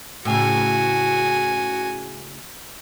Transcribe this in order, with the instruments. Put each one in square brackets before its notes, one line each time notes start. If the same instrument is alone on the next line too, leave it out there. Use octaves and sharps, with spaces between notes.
[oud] A2 C#3 [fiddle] F#4 G#5